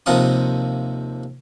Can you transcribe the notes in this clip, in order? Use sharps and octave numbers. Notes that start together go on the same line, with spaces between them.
D#2 C3 F3 A#4 F#5 D#6